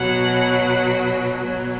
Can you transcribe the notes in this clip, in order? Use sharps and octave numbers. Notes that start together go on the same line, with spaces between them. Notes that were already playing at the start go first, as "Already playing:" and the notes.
Already playing: B2 F#3 F#5
B2 F#3